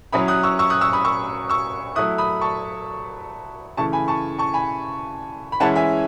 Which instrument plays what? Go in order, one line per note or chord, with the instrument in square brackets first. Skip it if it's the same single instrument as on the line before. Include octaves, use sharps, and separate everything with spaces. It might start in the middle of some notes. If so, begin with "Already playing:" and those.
[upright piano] F#3 C#4 E4 B5 D#6
D#6 F#6
C#6 E6
C#6 E6
D#6 F#6
C#6 E6
B5 D#6
C#6 E6
C#6 E6
F#3 A3 E4 D#6 F#6
B5 D#6
A5 C#6
C#3 E3 A3 A5 C#6
G#5 B5
A5 C#6
A5 C#6
G#5 B5
B5
E3 G#3 C#4 E4 F#5 A5
E5 G#5